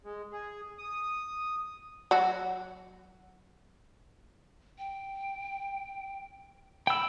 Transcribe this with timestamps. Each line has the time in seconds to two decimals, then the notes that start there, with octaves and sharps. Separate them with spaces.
0.05 G#3
0.32 G#4
0.78 D#6
2.11 F#3 F#4
4.78 G5
6.87 G5 B5 E6